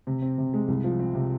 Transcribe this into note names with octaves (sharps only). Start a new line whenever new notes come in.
C3
C4
C3
G#3
C2
F3
C4
C3